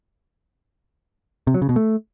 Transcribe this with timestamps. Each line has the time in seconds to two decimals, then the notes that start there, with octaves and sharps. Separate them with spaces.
1.47 C3
1.54 F#3
1.62 C#3
1.69 B2
1.76 A3